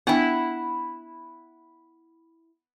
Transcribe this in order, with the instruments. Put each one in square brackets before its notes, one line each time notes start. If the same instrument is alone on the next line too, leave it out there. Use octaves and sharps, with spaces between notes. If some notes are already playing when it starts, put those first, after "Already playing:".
[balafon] B3 D4 G5 [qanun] E4 F#5